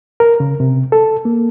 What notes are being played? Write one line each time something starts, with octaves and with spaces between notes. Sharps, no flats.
A#4
C#3
C3
A4
A#3